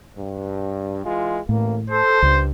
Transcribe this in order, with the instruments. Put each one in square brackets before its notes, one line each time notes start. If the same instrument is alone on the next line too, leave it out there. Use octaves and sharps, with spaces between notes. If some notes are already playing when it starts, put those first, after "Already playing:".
[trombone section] G2
E3 G#3 F4
[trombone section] A1 A#3 [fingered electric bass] A2
[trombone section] A4 [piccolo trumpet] C5
[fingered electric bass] C#2 [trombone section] G2